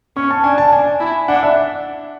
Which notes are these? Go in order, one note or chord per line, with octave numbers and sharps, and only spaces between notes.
C#4 C#6
A5
D4 G#5
A5
D4 G#5
E4
D4 F#5
E5